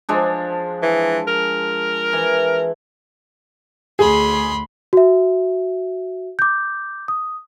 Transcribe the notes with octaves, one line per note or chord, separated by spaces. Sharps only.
F3 G#3 D4
E3
A#4
E3
D2 G#4 B5 C6
F#4 E5
D6 G6
D#6